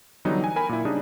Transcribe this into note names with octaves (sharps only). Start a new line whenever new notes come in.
D3 E3 F#3 G3 B3 D#4
G5 G#5
A#4 G#5 B5
A#2 E4
C#3 G3 D4 D#4 D#6